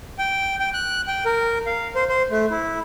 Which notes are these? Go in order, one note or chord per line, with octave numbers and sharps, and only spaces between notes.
G5
G5
F#6
G5
A#4
F5
C5
C5
A3
E4